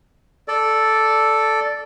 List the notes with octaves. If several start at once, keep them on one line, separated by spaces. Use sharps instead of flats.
A4 D5